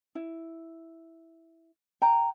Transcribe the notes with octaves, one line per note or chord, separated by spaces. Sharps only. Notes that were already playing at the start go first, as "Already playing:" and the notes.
E4
G5 A#5